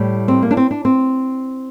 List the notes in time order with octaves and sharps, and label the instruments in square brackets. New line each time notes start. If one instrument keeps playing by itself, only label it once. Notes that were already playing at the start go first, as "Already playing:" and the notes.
Already playing: [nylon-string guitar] A2 G3
C4
A#3
D4
C4
D4
C4